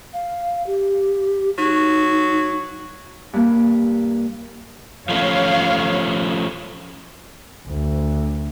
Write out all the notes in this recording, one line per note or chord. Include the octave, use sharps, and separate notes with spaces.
F5
G4
F#3 D#4
G2 A#3
F3 A3 C#4 C#5 F5
D2